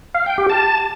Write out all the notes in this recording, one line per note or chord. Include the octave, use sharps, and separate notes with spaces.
F5
G5
G4
A5